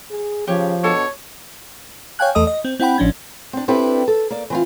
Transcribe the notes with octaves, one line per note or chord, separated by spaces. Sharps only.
G#4
C#3 F3 G4 C#5
B2 D4 A4 C#5 A5
C#5 F5 G5 G#5 F#6
E2 A3 A4 D#5 D#6
D#5
C4
C4 E4 F#5 G5 B5
A1 F3 C#4 D4 G#6
C4 D4
C4 D4 E4 G4 A4 B4
A4
A#3 D5
E3 C4 F4